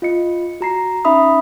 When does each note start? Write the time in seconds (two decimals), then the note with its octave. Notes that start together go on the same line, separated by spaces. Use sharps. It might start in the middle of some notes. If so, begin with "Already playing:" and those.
0.02 F4 D#5 C#7
0.61 F#4 A#5 C7
1.05 C#4 D#4 E5 B5 D#6